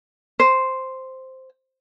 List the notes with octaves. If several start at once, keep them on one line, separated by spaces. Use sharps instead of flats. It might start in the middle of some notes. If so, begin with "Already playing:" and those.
C5